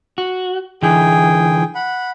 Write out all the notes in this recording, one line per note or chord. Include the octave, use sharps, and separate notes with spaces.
F#4
D3 E3 G#4 G5
F#5 B5